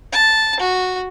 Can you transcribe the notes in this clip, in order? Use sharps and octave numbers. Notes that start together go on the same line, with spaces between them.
A5
F#4